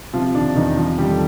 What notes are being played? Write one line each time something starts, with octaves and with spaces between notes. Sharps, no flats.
C3 F3 F4
D#3 D4
E2 D#3 D#4
C3 F3 F4
D#3 G3 G4
A4